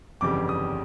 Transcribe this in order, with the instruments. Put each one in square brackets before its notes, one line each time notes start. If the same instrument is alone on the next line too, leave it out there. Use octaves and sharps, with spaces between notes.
[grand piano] G1 F2 C#3 E3 G3 D6
D#6